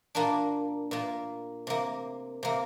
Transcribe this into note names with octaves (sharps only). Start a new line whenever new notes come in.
A#2 A#3 D4
A#2 A#3
C3 A#3
C3 A#3